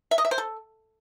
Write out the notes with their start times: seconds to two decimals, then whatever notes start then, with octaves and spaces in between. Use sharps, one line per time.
0.11 E5
0.18 D#5
0.25 E5
0.31 C5
0.38 A4